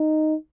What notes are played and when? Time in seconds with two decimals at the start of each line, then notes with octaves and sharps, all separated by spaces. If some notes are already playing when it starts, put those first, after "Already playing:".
Already playing: D#4